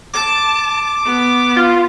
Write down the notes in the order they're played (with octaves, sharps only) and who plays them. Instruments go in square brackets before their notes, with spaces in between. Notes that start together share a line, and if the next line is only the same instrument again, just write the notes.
[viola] A5 [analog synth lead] D6
[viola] B3
[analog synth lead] F4